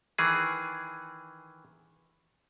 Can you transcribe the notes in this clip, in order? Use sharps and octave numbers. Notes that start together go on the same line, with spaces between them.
D#3 E3 G#4